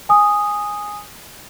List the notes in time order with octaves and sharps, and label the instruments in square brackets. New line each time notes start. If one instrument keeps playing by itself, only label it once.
[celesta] G#5 D#6